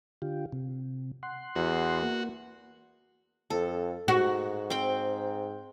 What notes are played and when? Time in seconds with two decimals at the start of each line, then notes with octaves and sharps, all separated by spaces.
0.22 D3 F4 G4
0.53 C3
1.23 F#5 C6
1.56 E2 F#4
2.02 A#3
3.50 F2 A4
4.08 G#2 F#4
4.70 C4 G5